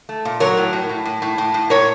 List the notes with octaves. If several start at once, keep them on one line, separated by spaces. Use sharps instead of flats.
A3
A#2
F#3 A#4 C#5
A2
A2
A2
A2
A2
A2
A2
A#2 A#4 C#5